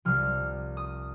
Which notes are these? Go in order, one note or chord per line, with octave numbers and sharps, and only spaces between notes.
C2 C3 F3 F6
D#6